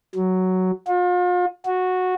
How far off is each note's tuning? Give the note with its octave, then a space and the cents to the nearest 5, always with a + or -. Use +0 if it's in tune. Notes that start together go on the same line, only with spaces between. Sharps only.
F#3 +5
F4 +40
F#4 -10